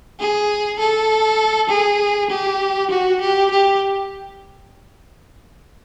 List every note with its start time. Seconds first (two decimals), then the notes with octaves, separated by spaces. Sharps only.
0.20 G#4
0.79 A4
1.69 G#4
2.30 G4
2.90 F#4
3.21 G4
3.50 G4